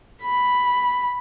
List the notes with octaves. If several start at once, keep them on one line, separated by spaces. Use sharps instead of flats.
B5